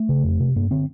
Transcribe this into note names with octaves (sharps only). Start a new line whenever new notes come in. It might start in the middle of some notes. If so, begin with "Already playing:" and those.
Already playing: A3
C#3
F2
C3
G2 A#3
D3 C4